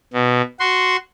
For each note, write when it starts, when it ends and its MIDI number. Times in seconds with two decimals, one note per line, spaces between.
0.13 0.42 47
0.60 0.96 66
0.60 0.96 84